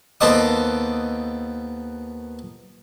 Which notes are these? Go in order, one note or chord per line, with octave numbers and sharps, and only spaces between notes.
D#2 B3 A4 C5 D#5 D6